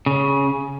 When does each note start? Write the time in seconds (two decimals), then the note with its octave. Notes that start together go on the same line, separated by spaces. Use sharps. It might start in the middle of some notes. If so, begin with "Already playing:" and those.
0.06 C#3